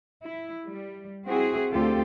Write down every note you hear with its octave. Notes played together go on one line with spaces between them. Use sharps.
E4
G3
C4 E4 F#4 G#4
D2 C4 F4 G4 A4